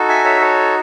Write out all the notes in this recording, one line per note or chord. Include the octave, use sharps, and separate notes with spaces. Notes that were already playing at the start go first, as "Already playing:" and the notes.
Already playing: D#4 F#4 A4
E5 G#5
C#5 E5
A4 C#5